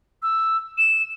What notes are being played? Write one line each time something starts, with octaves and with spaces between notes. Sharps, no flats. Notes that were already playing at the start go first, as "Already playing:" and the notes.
E6
E7